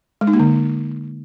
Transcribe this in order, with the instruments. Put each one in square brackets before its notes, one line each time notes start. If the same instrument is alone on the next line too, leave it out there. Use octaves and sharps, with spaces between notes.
[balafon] G#3
D#4
A#3
D3